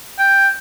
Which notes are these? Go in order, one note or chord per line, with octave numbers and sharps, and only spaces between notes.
G5